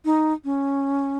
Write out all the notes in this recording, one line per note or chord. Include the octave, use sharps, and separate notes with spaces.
D#4
C#4